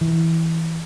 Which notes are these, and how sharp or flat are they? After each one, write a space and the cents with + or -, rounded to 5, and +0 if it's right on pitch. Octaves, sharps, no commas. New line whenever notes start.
E3 -10